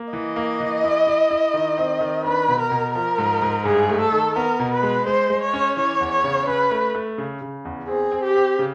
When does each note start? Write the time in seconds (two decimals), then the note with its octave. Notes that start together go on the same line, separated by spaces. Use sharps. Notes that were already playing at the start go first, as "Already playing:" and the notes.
Already playing: A#3
0.13 E3 D#5
0.36 A#3
0.60 E3
0.83 E4
1.07 E4
1.31 E4
1.54 D#3
1.78 C4
2.01 D#3
2.24 D4 B4
2.48 B2
2.60 A#4
2.72 B2
2.95 F3 A#4
3.18 G#2
3.42 G#2
3.65 G2 G#4
3.89 A3
4.00 A4
4.12 D#3
4.35 B3 A#4
4.60 B2
4.72 B4
4.83 G#3
5.06 G#3 C5
5.30 G#3
5.42 C#5
5.54 C#4
5.77 E3 C#5
6.01 E2
6.12 C#5
6.24 C#3
6.47 C#4 B4
6.71 A3
6.95 A3
7.18 C#3
7.42 C#3
7.65 E2
7.88 C4 G#4
8.12 C4
8.23 G4
8.35 C4
8.59 C#3